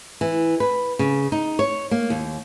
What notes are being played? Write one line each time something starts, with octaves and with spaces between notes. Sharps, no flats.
E3
B4
C#3
D#4
C#5
A#3
D#2